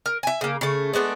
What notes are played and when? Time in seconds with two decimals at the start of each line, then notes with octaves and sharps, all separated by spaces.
0.06 A#4
0.23 E5 G#5
0.41 C#3 A#3
0.61 C#3 A3
0.93 G#3 A3 B3 D4